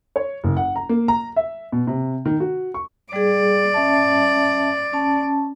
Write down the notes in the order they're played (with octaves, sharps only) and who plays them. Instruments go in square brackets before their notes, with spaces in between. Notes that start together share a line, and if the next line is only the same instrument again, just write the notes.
[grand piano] C#5
F#1
F#5
A#5
A#3
A#5
E5
B2
C3
D#3
F#4
C#6
[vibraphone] G3 G#4 [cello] D5
[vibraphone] C#4 E5 A5
C#4 A5